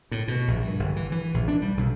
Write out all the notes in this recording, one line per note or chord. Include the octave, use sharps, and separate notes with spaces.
A2
B2
A#1
G2
G1
E3
E3
A#1
D4
G3
B1